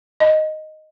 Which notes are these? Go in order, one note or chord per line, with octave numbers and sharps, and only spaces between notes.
D#5